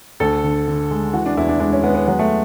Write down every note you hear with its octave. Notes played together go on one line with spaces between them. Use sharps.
D2 A4
D3
D3
G#3
E3 F#4
D4
E2 E4
D4
G#3 D4
C#4
G#3 B3
B3
F#3 B3
A3